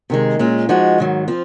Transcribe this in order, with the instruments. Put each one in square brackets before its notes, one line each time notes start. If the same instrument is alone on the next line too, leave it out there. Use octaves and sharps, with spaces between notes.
[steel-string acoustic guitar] C3 D#3 G#3
A#2 G#3 C#4 F4
F3 G#3 D#4 F#4
G#2 D#3 F#3
F3 C4 F4